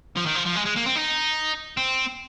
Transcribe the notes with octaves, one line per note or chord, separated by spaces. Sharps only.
F3
D#3
F3
F3
G#3
G#3
A#3
C4
D#4
C4